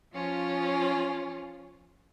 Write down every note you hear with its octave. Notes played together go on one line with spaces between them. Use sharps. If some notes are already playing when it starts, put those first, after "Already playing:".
F3 C#4 F4